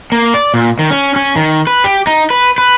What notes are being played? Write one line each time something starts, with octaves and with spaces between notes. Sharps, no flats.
A#3
D5
A#2
D#3
C#4
C#4
D#3
B4
G4
D#4
B4
B4